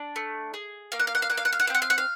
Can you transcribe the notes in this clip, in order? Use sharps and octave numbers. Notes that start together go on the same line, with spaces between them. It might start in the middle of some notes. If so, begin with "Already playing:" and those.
Already playing: D4
A3
G#4
A#3 F5
F#5
F5
F#5
F5
A#3 F#5
F5
F#5
F5
F#5
F5
C4 F#5
F5
F#5
F5